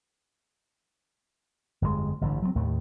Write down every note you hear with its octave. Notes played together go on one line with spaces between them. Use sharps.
G1 F2 B2 G#3
A1 G2 D3
F#3 G3 C4
D#2 A2 D#3 A3